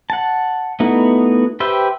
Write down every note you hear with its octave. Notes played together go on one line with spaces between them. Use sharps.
F#5 A5
A3 B3 D#4 E4 F#4
G4 B4 C5 E5 G5